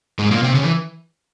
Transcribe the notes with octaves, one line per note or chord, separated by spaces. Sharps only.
G#2 G#3
A#2 A#3
C3 C4
C#3 C#4
E3